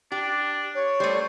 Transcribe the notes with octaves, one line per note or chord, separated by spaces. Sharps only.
D4 G4
C#5
G3 A3 C5